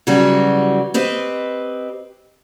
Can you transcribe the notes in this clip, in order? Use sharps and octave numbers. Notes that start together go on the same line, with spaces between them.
C#3 E3 F#3 G3 F#4
C4 G4 B4 D#5